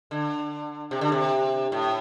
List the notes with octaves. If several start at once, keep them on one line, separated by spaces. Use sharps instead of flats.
D3
C3
D3
C3
A2